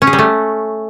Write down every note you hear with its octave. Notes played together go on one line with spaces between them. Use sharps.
C#4
G#4
G3
A3